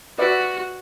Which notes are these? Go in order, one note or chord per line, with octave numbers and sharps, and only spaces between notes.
F#4 B4 D5 E5